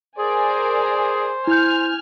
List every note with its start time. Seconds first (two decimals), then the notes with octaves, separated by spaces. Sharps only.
0.19 G#4 A#4 C5 D5 G#5
1.47 E4 G#5 F6 G6